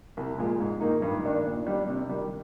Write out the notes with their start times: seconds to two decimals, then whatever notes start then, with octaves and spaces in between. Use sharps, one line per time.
0.17 C2
0.38 A#2 F3 G#3
0.60 G#2
0.81 D#3 A#3 D#4
1.02 G2
1.24 D#3 A#3 D4
1.45 A#2
1.67 G3 D4
1.88 C3
2.09 D#3 G3